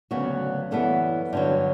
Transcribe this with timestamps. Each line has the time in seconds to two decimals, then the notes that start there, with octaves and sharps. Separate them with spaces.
0.11 D2 C#3 F#3 B3 F#4
0.71 F#2 E3 G3 B3 A4
1.33 G2 D3 F#3